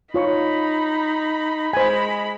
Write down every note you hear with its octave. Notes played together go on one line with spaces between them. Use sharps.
D#4 F4 C#5 B5 C#6
G#3 C5 G#5 B5